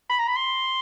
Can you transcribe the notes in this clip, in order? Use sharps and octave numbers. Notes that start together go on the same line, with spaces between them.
B5
A#5
B5
C6